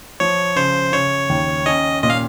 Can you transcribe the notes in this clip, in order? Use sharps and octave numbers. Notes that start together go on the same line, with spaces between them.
F3 C#5
C#3 C5
C#3 C#5
D#2
C#4 D#5
A#2 D#5
F5